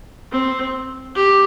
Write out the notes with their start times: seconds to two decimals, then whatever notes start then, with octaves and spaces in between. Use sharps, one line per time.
0.32 C4
1.16 G4